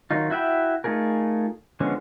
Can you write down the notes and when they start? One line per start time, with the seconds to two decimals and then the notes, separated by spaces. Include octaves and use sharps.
0.11 D#3 F#3 D#4 F4
0.30 E4 F#4 E5 G5 B5
0.84 A3 D#4 F4 G#4 A#4
1.80 D3 F3 G#3 B3 C#4